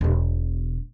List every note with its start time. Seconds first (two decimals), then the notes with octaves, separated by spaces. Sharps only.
0.01 E1 B2